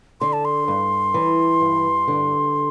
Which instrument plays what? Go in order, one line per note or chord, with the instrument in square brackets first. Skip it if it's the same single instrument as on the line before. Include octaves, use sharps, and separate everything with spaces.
[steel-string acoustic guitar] D3 [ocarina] C6
[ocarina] A5
C6
[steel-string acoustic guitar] G2
E3
G2
D3